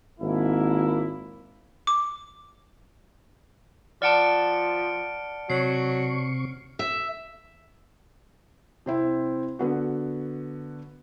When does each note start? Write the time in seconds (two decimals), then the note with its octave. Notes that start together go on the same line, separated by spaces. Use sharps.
0.20 G#1 A#3 E4
1.87 D6
4.02 F3 D5 F#5 A5 F6 C#7 D7
5.50 C3 F#3 C#6 C7
6.79 E5
8.86 C3 C4 E4
9.59 D3 B3 F#4